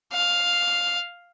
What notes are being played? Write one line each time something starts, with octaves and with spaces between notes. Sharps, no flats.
F5